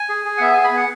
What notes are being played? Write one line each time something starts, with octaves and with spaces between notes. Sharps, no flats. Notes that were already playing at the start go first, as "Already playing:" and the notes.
Already playing: G#5
G#4
G#4
F#5
B3 E5
G#4 G#5
B5
B3 F#5